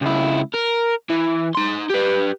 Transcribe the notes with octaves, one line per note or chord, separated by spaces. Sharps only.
C#2 E4
A#4
E3
D#4 C6
G4 B4